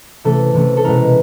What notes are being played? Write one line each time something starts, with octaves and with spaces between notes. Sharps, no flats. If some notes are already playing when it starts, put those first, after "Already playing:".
C3 E3 A3 C#4 A4
C3 E3 A3 C#4
A4
B2 G#3 C#4 E4 A#4